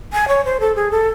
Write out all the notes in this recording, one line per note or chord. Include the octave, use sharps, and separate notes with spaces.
G#5
C#5
C5
A4
G#4
A4